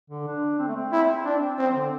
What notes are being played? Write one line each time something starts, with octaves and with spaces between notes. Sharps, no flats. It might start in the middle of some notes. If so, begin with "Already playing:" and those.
D3
D4
C4
A3
C4
E4
D4
C4
D3